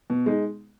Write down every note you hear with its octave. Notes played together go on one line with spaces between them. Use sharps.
B2
G#3 D#4